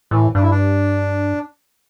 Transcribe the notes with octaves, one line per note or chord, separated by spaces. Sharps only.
A2 E3
G2 D4
E4
D4